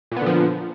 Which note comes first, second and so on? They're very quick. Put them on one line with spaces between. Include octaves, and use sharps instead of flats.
A#2 B3 D3 F3